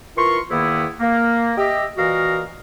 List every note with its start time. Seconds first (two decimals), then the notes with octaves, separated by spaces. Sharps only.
0.17 E3 F4 A#4 C6 C#6
0.50 E2 D#3 A#3 B3 E4
1.00 A#3
1.57 G4 D#5 E5
1.97 A#2 E3 F#4 A#4 D#5 F5